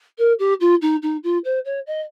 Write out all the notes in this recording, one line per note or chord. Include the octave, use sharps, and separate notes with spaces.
A#4
G4
F4
D#4
D#4
F4
C5
C#5
D#5